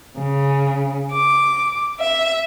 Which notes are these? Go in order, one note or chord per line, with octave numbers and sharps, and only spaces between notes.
C#3
D6
E5